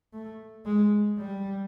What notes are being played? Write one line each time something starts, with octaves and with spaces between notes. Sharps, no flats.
A3
G#3
G3